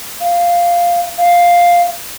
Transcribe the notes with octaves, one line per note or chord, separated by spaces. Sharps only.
F5
F5